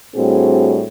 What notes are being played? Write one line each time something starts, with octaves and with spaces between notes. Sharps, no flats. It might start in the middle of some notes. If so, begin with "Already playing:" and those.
A2 G3 C4 D4 F#4 G#4